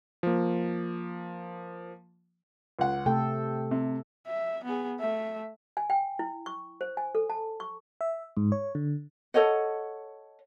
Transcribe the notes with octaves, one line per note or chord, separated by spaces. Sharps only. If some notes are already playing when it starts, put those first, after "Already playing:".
F3 A#3
C#2 F#5
C3 A3 A4 G5
C3
E5
B3 G#4
A3 E5
G#5
G5
E4
C#6
C5
G#5
A4
A5
C#6
E5
G#2
C#5
D3
A4 C#5 D#5 F#5